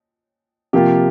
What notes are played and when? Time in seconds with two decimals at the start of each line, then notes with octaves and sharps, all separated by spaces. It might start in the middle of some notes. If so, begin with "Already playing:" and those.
0.73 C3 F3 A#3 F4 G4